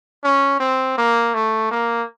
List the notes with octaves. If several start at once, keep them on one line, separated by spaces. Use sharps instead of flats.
C#4
C4
A#3
A3
A#3